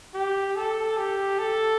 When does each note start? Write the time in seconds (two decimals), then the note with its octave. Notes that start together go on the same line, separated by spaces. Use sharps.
0.14 G4
0.56 A4
0.97 G4
1.39 A4